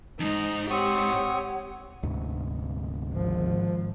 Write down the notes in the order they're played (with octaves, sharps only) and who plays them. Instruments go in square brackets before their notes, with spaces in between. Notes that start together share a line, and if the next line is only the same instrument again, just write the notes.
[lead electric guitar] F2 G#2 [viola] D#4
[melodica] C4 C#6 D#6 [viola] G4 [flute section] C#5 F#5
[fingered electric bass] D2 G#2 C3
[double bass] G#1 [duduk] F3